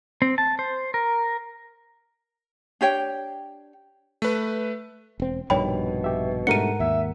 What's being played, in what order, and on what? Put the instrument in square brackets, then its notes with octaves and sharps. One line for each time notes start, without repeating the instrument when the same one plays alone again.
[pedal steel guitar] C4
A5
C5
A#4
[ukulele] D4 G4 C#5 G5
[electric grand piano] A3 B4
[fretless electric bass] E1 C4
[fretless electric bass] A#1 G2 D#3 [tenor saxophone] B2 [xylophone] C#5 G5 B5
[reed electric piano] G4 E5
[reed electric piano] G#2 A#4 F#5 [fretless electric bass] G3 A3 D4 [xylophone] C#7 D#7
[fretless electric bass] D#2 [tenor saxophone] E5